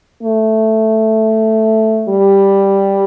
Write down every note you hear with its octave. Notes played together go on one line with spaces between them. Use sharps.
A3
G3